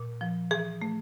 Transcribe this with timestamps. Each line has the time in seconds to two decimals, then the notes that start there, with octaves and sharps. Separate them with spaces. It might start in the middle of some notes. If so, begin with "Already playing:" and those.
Already playing: A#2
0.21 F3
0.51 E3 G#4
0.82 A3